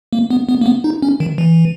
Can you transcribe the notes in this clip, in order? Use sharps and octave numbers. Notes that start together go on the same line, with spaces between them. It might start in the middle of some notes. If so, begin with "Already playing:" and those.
A#3
B3
B3
A#3
B3
D#4
C#4
D#3
E3